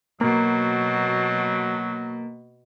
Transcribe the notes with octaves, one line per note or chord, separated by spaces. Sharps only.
B2 F#3 A#3